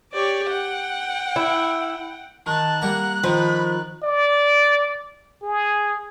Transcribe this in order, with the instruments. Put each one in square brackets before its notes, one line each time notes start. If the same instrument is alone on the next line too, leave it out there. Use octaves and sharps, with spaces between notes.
[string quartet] G4 C#5 D5
F#5 G5
[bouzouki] E4
[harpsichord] D#3 [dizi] A5 [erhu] F#6
[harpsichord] G3 A#3 A#5 [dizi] F#5
[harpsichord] D#3 [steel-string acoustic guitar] F3 [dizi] B5
[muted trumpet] D5
G#4